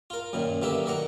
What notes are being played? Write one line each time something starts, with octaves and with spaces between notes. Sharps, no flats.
F4 A#4
F#2 A#2 D#3
B2 D3 A#3 G4 D5 E5
D#3 D5 F#5 A#5